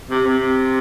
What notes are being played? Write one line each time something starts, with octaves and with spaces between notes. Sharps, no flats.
C3
C3